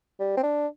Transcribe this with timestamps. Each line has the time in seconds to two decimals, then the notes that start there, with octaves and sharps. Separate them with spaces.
0.20 G3
0.37 C4
0.43 D4